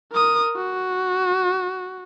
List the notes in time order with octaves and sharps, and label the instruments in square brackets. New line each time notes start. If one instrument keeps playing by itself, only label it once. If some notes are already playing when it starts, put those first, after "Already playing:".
[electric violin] A#4 D#6
F#4